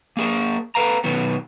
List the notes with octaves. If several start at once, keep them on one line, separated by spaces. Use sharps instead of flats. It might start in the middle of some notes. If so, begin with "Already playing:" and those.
A#3 G#4 A#4
A4 B4 F5 A#5
B2 D#3 F#3 B3